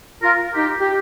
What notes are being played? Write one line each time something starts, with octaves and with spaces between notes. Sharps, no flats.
F4 A#4
D#4 G4
G4